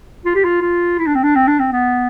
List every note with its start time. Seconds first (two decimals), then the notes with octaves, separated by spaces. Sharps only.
0.25 F4
0.35 G4
0.44 F4
0.61 F4
0.98 E4
1.07 D4
1.15 C4
1.23 D4
1.35 C4
1.47 D4
1.59 C4
1.72 B3